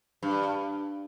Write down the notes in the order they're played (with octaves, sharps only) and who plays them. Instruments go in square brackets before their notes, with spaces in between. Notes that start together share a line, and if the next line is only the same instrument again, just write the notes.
[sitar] G2